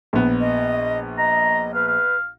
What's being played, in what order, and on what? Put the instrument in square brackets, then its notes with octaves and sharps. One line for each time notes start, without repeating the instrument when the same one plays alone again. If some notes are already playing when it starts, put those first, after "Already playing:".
[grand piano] A#1 B3
[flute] D#5
[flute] D#5 [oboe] A#5
[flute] B4 [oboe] F5
[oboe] F5